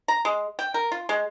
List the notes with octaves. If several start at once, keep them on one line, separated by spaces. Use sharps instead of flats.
A#5
G#3
G5
A#4
F4
G#3